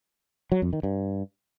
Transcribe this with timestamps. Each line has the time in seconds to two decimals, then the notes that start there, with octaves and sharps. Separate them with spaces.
0.52 F#3
0.62 F2
0.73 D#3
0.83 G2